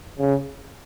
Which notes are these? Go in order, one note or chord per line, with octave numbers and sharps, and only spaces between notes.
C#3